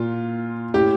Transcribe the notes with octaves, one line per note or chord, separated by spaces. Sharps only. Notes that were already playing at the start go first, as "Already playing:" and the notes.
Already playing: A#2 F4
A2 G4